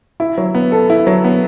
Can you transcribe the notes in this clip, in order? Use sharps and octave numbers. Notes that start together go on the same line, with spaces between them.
E4
F#3
B3
A4
E4
F#3
B3